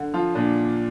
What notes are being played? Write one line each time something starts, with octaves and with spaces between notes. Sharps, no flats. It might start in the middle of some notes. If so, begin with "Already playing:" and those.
Already playing: D3
F3 F4
A#2 D4